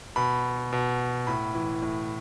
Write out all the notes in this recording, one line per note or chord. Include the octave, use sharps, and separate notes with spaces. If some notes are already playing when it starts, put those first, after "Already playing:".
B2 B5
B2
A2 B5
E3
A2